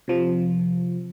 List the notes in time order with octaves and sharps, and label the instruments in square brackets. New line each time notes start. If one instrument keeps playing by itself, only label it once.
[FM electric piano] C3 F3